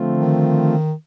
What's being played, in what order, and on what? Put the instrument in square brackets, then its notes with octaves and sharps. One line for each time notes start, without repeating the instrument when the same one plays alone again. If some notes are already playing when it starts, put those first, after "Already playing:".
Already playing: [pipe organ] D3 F3 A3 C4 F4
[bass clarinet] D#3